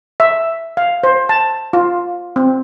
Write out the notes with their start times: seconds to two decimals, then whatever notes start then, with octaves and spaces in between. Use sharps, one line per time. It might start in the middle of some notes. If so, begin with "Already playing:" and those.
0.20 E5
0.77 F5
1.04 C5
1.29 A5
1.73 F4
2.36 C4